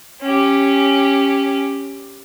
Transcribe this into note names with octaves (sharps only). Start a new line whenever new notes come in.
C#4 G4